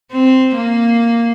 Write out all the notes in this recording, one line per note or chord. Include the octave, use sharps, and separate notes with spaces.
C4
A#3